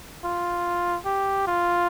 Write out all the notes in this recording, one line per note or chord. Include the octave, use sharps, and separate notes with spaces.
F4
G4
F4